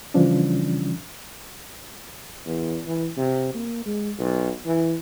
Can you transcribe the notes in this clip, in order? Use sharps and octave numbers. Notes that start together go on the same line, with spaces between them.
C#3 E3 F3 G3 C#4 D4
E2
E3
C3
A#3
G#3
B1
E3